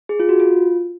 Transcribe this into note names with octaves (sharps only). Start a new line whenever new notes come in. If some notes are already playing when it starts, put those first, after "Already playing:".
G#4
F4
F#4
F4